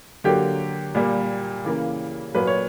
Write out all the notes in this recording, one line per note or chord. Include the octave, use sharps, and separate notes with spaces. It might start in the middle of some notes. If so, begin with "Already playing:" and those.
D3 F#3 A#3 G4
A#2 G3 A#3
C#3 E3 A#3
A#2 F#3 A#3 B4
C#5